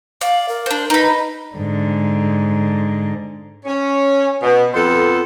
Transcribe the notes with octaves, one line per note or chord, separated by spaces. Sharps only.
D5 F5
A#4
D4 C5
D#4 B4 B5
G#2 D3
C#4
B2
F2 B3 A4 C5